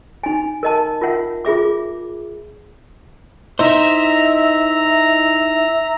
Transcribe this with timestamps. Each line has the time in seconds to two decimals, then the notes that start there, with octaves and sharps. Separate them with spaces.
0.24 D#4 G#5
0.63 A#4 D#5 A5
1.01 F4 A#4 E5 F#5
1.45 F4 G#4 E5 D6
3.59 D#4 E4 C5 D#5 E5 A#5